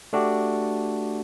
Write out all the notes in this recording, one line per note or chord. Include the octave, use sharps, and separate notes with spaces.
A3 D4 F#4 G4